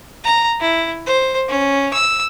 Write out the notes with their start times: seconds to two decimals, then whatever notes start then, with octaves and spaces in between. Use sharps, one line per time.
0.24 A#5
0.60 E4
1.07 C5
1.48 C#4
1.93 E6